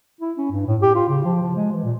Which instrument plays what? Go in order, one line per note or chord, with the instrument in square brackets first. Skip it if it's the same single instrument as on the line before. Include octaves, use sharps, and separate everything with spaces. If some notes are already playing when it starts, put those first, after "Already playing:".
[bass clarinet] E4
C#4
G2
A2
G4
F4
C#3
F3
F3
G#3
E3
A#2